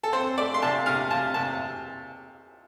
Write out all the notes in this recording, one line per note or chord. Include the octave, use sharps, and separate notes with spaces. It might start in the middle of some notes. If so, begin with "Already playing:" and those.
A4
C4 C5
A3 D5
C6
C3 A5
C3 F5
C3 A5
C3 A5